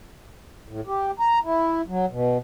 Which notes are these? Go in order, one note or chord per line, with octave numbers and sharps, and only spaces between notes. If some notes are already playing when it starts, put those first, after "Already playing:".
A2
G4
A#5
E4
F#3
B2